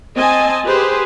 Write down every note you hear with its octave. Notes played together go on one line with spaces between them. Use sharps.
C4 D#5 G#5 A5
G4 G#4 B4 C5